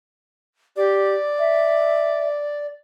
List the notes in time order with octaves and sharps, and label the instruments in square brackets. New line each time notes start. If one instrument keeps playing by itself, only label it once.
[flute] G4 [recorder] D5
[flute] E5